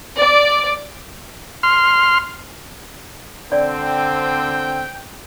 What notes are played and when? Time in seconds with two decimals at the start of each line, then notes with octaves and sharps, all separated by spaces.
0.18 D5
1.63 C6 F6
3.52 D3 C4 D5 G5